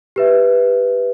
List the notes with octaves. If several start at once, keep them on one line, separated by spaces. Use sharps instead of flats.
G4 B4 E5